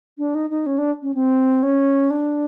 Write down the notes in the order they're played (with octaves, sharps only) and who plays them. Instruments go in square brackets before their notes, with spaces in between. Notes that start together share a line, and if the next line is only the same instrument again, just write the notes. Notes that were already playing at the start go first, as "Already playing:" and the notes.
[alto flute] D4
D#4
D#4
C#4
D4
C#4
C4
C#4
D4